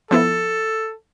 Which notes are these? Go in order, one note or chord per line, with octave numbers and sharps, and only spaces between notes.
F3 B3 E4 A4